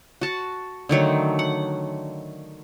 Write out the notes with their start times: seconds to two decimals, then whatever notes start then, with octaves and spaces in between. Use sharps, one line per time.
0.21 F#4 A5
0.89 D3 D#3 F#3 A3
1.39 F#5